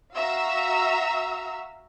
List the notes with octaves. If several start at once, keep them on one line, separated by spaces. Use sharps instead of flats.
F#4 E5 F5 A#5 E6